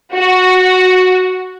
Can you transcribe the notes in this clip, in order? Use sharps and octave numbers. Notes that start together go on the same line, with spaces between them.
F#4